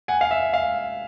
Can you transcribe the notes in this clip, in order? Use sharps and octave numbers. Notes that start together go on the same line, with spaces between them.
F#5 G#5
F5
E5
F5